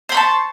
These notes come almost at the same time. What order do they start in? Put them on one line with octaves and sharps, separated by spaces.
C5 B5 C#6 A5